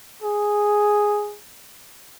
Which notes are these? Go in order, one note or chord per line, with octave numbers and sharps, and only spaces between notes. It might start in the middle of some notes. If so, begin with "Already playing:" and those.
G#4